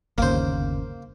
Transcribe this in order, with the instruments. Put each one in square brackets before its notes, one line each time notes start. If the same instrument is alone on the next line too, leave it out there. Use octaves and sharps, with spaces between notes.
[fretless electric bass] G1 D#2 C#3 [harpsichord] A#3 C5